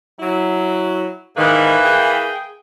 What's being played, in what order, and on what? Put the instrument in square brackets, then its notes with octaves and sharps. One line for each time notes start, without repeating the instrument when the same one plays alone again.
[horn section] F#3 E4
[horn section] G#2 D#3 [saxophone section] E3 A#3 B4
[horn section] G#4 G5